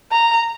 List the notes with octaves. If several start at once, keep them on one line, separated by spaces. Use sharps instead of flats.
A#5